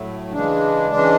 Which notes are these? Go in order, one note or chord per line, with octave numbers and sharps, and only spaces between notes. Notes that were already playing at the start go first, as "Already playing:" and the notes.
Already playing: A2 F#3 A3
C#3 E3 G#3 D4
C#3 E3 G#3